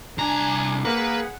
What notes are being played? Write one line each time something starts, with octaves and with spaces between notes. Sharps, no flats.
C2 D4 G#5 A#5
A#3 G#4 B4 F#5